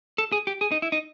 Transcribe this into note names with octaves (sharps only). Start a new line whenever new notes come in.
A4
G#4
G4
G#4
D#4
E4
D#4